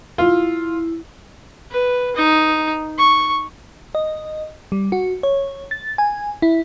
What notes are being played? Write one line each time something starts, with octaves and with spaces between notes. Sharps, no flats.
E4 F4
B4
D#4
C#6
D#5
G3
F#4
C#5
A6
G#5
E4